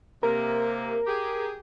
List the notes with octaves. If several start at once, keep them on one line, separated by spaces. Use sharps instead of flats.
C3 A#3 A#4
G4 G#4